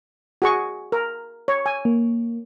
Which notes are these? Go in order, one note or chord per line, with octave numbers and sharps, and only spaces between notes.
F#4 G#4 C#6
A#4
C#5
G#5
A#3